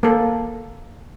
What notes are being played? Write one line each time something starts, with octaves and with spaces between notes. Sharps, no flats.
A#3 A4